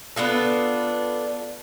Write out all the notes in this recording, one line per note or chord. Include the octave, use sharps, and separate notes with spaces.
B3 D4 F4 A4